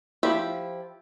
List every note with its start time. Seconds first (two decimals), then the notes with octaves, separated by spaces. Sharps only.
0.23 F3 E4 G4 B5